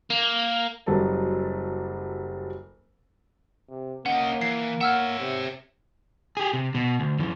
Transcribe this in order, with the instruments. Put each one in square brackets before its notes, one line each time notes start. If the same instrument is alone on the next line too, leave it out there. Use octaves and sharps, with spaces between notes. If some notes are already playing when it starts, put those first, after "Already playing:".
[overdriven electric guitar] A#3
[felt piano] F#1 F#3 G3 A4 A5
[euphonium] C3
[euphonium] A#3 [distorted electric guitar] C#4 D#5 [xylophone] F#5
[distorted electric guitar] E3 [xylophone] C7
[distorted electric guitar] C#5 E5 [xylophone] F#5 E6 F6
[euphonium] C3
[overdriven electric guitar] G4 G#4
C3
B2
D2
F#2 E3